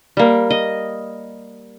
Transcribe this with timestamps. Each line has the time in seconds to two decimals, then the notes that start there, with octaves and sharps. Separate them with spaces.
0.17 G3 A#3
0.50 D#5